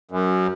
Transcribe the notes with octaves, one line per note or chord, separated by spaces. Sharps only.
F#2